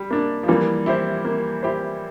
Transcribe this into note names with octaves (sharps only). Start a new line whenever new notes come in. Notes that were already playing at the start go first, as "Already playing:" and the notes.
Already playing: G3
A#3 D4
F3
E3 G3 A#3
E4 G4 C5
A#3
E4 G4 C5